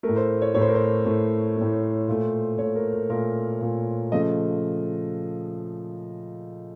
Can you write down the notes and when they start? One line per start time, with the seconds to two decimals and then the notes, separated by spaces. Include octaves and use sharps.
0.03 A2 A3 A#4
0.16 C5
0.42 C#5
0.54 A2 A3 C#5
0.61 C5
0.68 A#4
0.75 C5
1.05 A2 A3
1.56 A2 A3
2.08 A#2 A3
2.58 A#2 A3 C#5
2.76 A#4
2.93 A#4
3.10 A#2 A3 A#4
3.61 A#2 A3
4.12 C#3 F3 A3 D#5